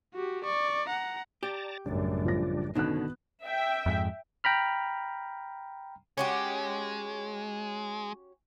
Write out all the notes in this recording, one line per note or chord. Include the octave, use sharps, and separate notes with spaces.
F#4 G4
D5 C#6
F#5 A#5
G4 D5 A5 A#5
A1 F#2 C#3 G3 D4
F3 A#6
B2 D3 D#3 B3 C#4 F#6
E5 G5
F2 G#2
G5 A#5 B5 F6
G#3 C#4 F#4 G4